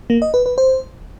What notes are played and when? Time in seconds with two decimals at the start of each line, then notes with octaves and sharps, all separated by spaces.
0.10 A#3
0.22 D#5
0.34 B4
0.46 B4
0.58 C5